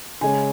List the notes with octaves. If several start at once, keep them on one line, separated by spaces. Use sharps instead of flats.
C#3 G#3 C#4 G#5